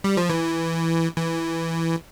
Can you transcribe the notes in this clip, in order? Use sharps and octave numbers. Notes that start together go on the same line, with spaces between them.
G3
F3
E3
E3